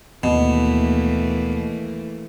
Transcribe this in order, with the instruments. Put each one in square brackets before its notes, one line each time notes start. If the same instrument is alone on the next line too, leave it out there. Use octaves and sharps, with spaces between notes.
[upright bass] D#2 [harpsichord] B2 [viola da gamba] E3 A3 A#3